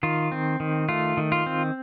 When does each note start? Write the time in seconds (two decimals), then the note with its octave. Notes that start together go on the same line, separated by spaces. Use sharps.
0.03 D#3 F4
0.32 C4
0.60 D#3
0.89 A3 F4
1.17 D#3
1.32 F4
1.46 C4